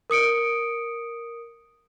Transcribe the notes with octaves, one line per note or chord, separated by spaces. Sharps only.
A#4 D#6 C#7 D7